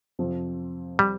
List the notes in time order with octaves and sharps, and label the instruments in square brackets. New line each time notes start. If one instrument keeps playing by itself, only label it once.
[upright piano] F2 C3 F3 C4
[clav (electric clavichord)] G3